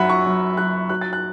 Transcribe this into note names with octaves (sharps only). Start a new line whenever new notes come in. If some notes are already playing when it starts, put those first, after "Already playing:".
Already playing: F#2 F#3 E5 F#5 B5
C#6
F#2
F#3 F#6
F#3 F#6
A6
F#6